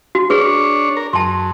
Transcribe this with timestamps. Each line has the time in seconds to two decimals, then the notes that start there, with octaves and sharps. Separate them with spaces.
0.15 F#4
0.30 D4 G#4 B4 C#5
0.97 A#4
1.13 F#2 A5 C6